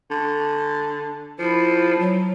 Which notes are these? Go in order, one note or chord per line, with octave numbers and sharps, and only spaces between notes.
D3
F3 E4
F#3